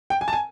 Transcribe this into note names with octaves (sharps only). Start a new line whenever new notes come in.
G5
G#5
A5
G#5